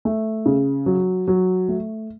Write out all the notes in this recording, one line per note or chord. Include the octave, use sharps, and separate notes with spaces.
A3
C#3
F#3
F#3
A3